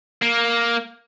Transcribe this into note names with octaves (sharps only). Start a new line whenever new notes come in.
A#3